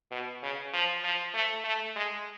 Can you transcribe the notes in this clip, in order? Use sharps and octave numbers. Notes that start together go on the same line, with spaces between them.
B2
C#3
F3
F3
A3
A3
G#3